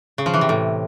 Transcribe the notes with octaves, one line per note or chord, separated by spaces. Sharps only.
C#3
F3
E3
C3
A2